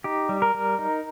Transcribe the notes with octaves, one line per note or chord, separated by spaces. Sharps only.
D#4 G4
G3
A#4
G3
D#4